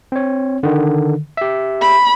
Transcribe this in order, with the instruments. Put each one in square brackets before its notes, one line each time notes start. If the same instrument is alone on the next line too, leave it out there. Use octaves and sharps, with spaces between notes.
[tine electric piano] C4 C#5
D3 D#3
G4 E5
[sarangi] B5